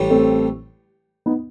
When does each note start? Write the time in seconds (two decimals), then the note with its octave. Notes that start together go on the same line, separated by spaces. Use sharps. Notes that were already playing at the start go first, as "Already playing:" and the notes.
Already playing: A1 A2 G3
0.10 A3 C4
1.26 B3 D#4